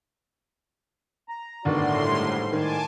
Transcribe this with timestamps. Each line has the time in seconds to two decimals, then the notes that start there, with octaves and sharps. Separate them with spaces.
1.29 A#5
1.65 G1 A2 D#3 F#4 D5 C6
2.06 G#2 G3
2.52 D#3 G#5 A5 D6